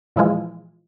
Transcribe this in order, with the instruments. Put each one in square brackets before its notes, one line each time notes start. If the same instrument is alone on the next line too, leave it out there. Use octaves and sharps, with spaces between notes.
[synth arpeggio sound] A#2 E3 F3 G#3 F4